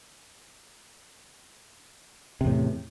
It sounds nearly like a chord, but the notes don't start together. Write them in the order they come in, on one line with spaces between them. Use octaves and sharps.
C3 E2 A2